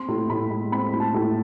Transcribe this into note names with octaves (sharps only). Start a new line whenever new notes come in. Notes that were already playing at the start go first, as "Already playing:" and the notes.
Already playing: C4 C6
A2
A2 B5
G#3
C4 B5
A2
A5
A2